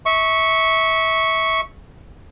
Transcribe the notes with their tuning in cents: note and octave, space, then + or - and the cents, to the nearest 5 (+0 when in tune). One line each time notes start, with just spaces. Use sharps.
E5 -25 C#6 +0